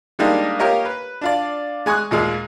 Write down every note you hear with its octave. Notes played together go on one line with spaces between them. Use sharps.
G3 G#3 A#3 D4 D#4 G4
A#3 F4 G4 A#4 C#5 D#5
B4
D4 F4 D5
G#3 G#5 C#6 D#6 F#6
D#2 A#2 G#3 F5